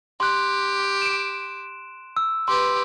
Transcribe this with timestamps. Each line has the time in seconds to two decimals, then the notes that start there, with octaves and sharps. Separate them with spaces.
0.20 G4 C6 F#6
1.02 D7 E7
2.17 E6
2.48 G4 B4 C6